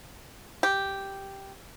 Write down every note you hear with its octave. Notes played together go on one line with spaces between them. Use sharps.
G4